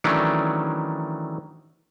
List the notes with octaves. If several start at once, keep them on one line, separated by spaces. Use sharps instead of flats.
D#3 E3 F#3 A3 C#4 D4